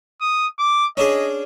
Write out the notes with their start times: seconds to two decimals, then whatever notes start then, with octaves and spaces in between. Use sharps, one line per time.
0.21 D#6
0.59 D6
0.97 C#4 D4 G#4 D#5